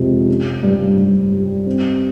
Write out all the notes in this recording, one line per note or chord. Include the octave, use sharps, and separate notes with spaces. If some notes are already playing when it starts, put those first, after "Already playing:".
Already playing: F2 C3 F3 G#3
C#4
G2
G2
G3
C4